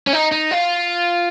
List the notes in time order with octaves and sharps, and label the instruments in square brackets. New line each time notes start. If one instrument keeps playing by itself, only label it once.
[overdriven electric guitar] C#4
D#4
D#4
F4